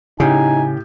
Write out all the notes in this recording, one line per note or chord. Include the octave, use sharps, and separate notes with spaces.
A2 C#3 D#4 G4 G#5 G6